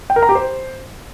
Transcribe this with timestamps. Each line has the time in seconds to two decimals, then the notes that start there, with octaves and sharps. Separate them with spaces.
0.10 G5
0.16 A#4
0.23 A#5
0.29 G4
0.35 C5